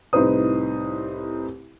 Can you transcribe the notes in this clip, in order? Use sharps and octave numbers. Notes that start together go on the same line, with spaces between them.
C2 A2 D#4 B4 C5 D#6